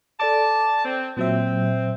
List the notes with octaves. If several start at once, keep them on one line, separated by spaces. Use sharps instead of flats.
A4 D5 A5 D6
C4
A#2 F#3 C4 E5